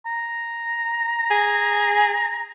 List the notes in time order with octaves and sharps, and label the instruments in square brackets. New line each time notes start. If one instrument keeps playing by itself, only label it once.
[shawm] A#5
[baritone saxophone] G#4